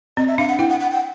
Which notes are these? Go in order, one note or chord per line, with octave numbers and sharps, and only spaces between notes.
C4 D#5
E5
D4 F5
F#5
E4 G5
F#5
F#5
G5